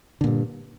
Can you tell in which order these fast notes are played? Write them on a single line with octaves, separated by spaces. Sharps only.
D3 A#2 G2